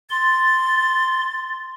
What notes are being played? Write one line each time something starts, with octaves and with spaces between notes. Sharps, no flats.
C6 A6